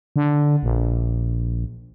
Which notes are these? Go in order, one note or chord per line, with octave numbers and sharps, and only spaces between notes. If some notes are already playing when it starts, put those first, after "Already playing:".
D3
A#1